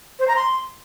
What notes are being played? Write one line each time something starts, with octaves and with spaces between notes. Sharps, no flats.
C5
A#5
C6